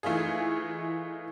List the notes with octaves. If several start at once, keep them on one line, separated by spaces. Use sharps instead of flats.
E3 A3 D#4 F4 G#4